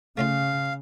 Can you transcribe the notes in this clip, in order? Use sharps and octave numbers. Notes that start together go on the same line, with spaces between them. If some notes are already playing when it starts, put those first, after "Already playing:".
C#3 A3 C#4 F4 F5